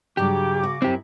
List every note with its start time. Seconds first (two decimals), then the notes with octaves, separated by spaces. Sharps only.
0.17 G2 C#3 F#3 D4 G4 D6
0.63 F#4
0.82 F#2 C4 E4 G4